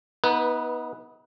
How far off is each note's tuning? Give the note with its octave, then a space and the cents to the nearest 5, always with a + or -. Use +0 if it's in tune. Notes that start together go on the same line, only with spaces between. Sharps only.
B3 -15 D#4 +35 B4 +0